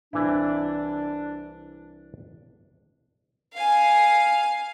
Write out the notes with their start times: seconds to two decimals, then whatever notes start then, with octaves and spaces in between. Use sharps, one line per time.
0.13 C2 E3 D4 E4
3.54 F5 G#5